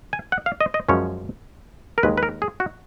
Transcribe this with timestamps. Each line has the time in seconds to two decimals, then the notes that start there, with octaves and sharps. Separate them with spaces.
0.13 G#5
0.32 F#5
0.46 F5
0.61 D#5
0.74 D#5
0.89 F#2 F3 G#3 C#4 C#5
1.98 A#4
2.03 D#2 D#3 G#3 B4
2.18 B4
2.23 A#4
2.42 G#4
2.60 F#4